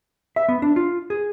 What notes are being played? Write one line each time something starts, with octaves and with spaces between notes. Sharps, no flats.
E5
B3
D4
F4
G#4